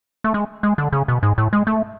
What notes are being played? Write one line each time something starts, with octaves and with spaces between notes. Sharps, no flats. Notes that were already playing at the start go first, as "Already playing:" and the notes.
A3
G#3
G#3
D3
C#3
B2
G#2
A2
G#3
A3